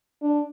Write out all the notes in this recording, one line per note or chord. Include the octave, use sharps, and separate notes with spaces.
D4